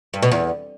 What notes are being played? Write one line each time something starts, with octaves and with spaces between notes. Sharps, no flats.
G2
B2
E2